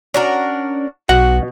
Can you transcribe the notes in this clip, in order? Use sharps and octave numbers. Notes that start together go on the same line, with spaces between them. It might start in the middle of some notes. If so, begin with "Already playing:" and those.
C#4 D4 F#4 A#4
B1 B2 F#4 F#5